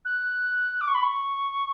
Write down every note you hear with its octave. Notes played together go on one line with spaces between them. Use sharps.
F#6
D6
C#6
B5
C#6